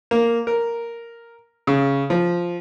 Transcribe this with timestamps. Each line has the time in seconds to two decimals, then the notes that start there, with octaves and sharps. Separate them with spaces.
0.11 A#3
0.47 A#4
1.67 C#3
2.10 F3